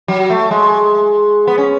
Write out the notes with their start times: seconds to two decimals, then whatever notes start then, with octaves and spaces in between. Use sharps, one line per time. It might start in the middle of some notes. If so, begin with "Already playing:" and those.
0.08 F#3
0.30 A3
0.51 G#3
1.47 B3
1.58 C#4